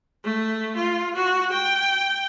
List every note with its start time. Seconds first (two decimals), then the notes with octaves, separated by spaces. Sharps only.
0.24 A3
0.76 F4
1.15 F#4
1.52 G5